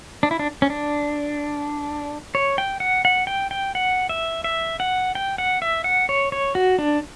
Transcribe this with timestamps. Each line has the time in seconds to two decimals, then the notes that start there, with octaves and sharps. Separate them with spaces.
0.23 D4
0.31 E4
0.39 D4
0.62 C#4
0.70 D4
2.35 C#5
2.58 G5
2.80 F#5
3.05 F#5
3.27 G5
3.51 G5
3.75 F#5
4.09 E5
4.44 E5
4.80 F#5
5.15 G5
5.38 F#5
5.62 E5
5.84 F#5
6.09 C#5
6.32 C#5
6.55 F#4
6.79 D4